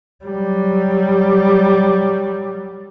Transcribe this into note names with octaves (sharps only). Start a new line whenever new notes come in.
F#3 G3